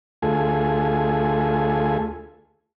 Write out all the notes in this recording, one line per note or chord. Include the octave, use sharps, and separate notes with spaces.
D2 A3 F4 G#4 A4 G#5